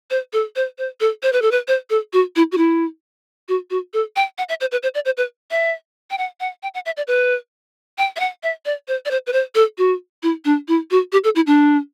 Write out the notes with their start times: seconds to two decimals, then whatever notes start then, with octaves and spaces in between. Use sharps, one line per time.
0.10 C5
0.33 A4
0.56 C5
0.78 C5
1.00 A4
1.23 C5
1.32 B4
1.42 A4
1.51 B4
1.68 C5
1.90 A4
2.13 F#4
2.36 E4
2.52 F#4
2.57 E4
3.48 F#4
3.70 F#4
3.93 A4
4.16 G5
4.38 F#5
4.49 E5
4.60 C5
4.71 B4
4.83 C5
4.94 D5
5.05 C5
5.17 B4
5.51 E5
6.10 G5
6.18 F#5
6.40 F#5
6.63 G5
6.74 F#5
6.86 E5
6.97 D5
7.07 B4
7.98 G5
8.16 E5
8.20 F#5
8.43 E5
8.65 D5
8.88 C5
9.05 D5
9.11 C5
9.27 B4
9.33 C5
9.55 A4
9.78 F#4
10.23 E4
10.45 D4
10.68 E4
10.91 F#4
11.12 G4
11.24 A4
11.35 E4
11.47 D4